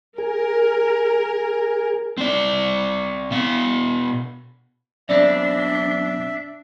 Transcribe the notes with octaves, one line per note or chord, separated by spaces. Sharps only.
G#4 A#4
C4 D5
B2 F5
F#2 B2 C4 D4 D5 E5